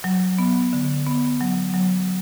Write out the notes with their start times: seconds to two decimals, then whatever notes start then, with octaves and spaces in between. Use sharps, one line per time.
0.04 F#3
0.38 B3
0.73 D3
1.07 B3
1.41 F#3
1.74 F#3